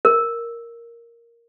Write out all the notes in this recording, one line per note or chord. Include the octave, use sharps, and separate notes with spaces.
A#4